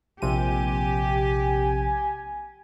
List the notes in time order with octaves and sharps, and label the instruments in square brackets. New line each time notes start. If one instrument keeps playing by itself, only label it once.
[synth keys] A#1 C3 D#7 [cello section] G4 [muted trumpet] G#5